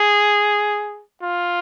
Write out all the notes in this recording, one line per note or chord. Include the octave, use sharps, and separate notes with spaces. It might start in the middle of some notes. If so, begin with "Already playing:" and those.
Already playing: G#4
F4